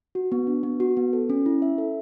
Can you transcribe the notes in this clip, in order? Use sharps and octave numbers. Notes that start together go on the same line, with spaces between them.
F#4
B3
D4
B3
F#4
B3
A4
C#4
E4
E5
A4